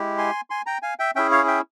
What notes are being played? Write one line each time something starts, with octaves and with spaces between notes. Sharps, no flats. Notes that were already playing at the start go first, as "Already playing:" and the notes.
Already playing: G#3 E4 G4
G#5 C6
G#5 C6
G5 A#5
F5 G#5
E5 G5
C#4 E4 G#4 E5 G5
C#5 F5
E5 G5